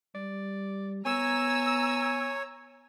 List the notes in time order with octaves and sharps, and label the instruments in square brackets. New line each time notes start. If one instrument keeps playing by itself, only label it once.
[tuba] G3 [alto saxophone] D5
[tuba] B3 [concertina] C#5 [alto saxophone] G#5 [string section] A#5 E6